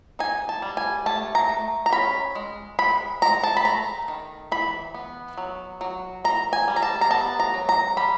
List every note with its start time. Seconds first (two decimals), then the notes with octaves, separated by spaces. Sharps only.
0.19 D#4 G#5
0.49 A5
0.62 G3
0.77 G#5
1.06 A3 A5
1.35 A#5
1.49 A3
1.86 A#5
1.93 C#4 B5
2.35 G#3
2.79 G#3 B5
3.22 G#3 A#5
3.43 A5
3.57 B5
3.65 A3 A#5
4.08 D#3
4.52 E3 B5
4.94 B3
5.38 F#3
5.81 F#3
6.24 E3 A#5
6.53 G#5
6.68 G3
6.76 A#5
6.82 A5
7.01 A#5
7.10 B3 A5
7.40 A#5
7.54 F#3
7.69 A#5
7.97 G3 B5